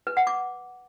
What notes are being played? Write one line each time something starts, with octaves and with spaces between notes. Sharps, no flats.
B4
F#5
D6